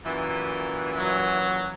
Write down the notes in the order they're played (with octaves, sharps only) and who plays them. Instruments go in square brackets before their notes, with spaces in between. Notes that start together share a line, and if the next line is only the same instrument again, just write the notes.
[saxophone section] F#2 A#2 E3
[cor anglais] F#3